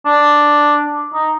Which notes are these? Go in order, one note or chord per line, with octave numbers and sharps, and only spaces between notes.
D4
D#4